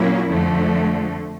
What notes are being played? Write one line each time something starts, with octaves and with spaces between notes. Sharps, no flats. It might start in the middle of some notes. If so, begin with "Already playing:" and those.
Already playing: A#2 F#3 A#3 C#4 E4
F2 D3 F3 A3